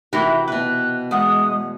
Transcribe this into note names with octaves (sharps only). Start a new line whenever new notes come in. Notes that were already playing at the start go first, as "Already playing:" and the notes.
C3 E3 E4 F#4 G4 A#4 B5
B2 B4 F#6
E2 G#3 F#5 D#6